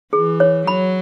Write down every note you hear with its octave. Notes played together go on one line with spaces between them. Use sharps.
E3 G#4
C#5
F#3 B5